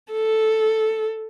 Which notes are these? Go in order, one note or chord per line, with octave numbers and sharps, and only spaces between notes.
A4